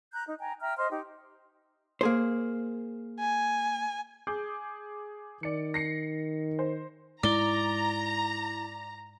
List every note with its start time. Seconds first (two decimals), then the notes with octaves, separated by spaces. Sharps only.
0.12 A#5 F#6 G6
0.24 D#4
0.39 G5 G#5 A#5
0.60 E5 G5 A#5 F6
0.77 C5 D#5 C6 F6
0.90 D#4 G4
2.01 A#3 G#4 C5
3.20 G#5
4.27 G#4 D6 G6
5.43 D#3 D5 C#7
5.74 A#6 C7 C#7
6.59 C5
7.23 G#2 G#3 E4 D5 A#5 G7